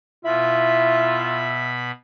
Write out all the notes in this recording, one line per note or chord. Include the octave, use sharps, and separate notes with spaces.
B2 E4 F4 E5 B5